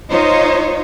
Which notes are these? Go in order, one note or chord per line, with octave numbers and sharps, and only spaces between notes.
D#4 F4 C5 C#5